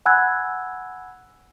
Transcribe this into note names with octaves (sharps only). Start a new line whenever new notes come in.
F#5 G#5 B5 E6 F#6 G#6